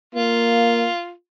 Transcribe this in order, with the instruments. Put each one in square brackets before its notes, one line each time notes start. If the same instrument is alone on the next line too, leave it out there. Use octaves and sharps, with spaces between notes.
[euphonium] A#3 [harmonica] F4